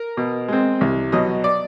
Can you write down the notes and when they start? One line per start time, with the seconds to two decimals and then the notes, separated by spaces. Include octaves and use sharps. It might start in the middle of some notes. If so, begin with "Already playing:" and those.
Already playing: A#4
0.17 B2
0.48 G#3 C4
0.81 C2
1.12 B2 F#3 D#5
1.44 D5